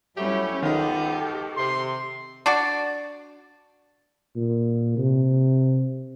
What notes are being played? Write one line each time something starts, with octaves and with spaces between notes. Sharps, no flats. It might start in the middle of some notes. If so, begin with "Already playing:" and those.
F#3 G3 A3 C#4 E4 G4
G#2 D#3 B3 D#4 F4 G4 A4
C3 C6
D4 F#4 D5
A#2
C3